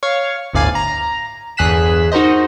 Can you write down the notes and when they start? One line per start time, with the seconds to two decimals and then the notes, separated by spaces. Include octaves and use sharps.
0.03 C#5 F5 C#6
0.54 G1 D2 A2 D5 F5 G#5
0.75 A#5
1.57 G1 E2 G#4 F#6 B6 E7
2.12 D#4 F#4 A#4 C5 D#5